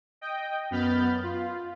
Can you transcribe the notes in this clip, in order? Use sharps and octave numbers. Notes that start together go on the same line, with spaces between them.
D#5 G5
F#2 B3 B5 F6 G6 A6
F4